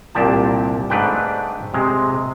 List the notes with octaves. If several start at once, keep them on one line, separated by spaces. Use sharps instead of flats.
C2 A#2 G4 A5
G#2 A3 D4 B4 G5
C3 G#3